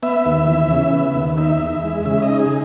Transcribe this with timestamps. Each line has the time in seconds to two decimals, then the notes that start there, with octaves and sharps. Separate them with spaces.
0.03 B3 E5
0.25 D#2
0.47 E3
0.71 C#3
0.93 B3
1.15 D#2
1.38 D#4 E5
1.60 E2
1.83 G#3
2.05 C#3 E5
2.22 D#5
2.28 D#4
2.39 G#4